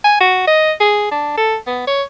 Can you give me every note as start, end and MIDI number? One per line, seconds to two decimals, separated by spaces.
0.04 0.17 80
0.21 0.45 66
0.47 0.72 75
0.80 1.10 68
1.11 1.36 62
1.37 1.56 69
1.67 1.85 59
1.87 2.03 73